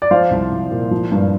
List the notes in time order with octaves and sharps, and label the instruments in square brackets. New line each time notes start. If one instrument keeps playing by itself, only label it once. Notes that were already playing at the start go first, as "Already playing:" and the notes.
[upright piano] D5
F3 C5 F5
C2
C2
A#2
F3
G2